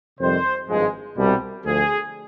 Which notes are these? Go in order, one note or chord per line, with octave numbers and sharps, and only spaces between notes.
F2 C3 D#3 G3 C5
G#1 G2 F3 G#3
C2 B2 G3
D2 D3 F3 G#4